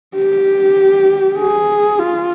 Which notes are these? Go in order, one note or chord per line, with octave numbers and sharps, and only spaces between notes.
G4
G#4
F4